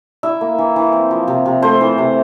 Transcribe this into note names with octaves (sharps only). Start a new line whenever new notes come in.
E4 E5
A#3
E3
E3
C4
F3
C3
C3
A3 C5
E3
C3